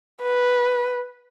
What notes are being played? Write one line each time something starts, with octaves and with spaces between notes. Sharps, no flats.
B4